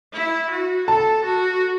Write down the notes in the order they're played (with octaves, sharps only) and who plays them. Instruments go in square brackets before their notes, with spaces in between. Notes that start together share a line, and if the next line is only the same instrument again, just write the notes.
[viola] E4
F#4
[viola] A4 [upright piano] A5
[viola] F#4